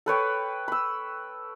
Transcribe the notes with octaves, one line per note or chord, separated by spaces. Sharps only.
A4 B4 C#5 G5
B5 E6